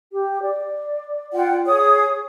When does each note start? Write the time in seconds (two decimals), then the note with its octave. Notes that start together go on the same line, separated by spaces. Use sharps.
0.12 G4
0.42 D5
1.33 F4 F#5 G5
1.66 G#4 C#5 D#6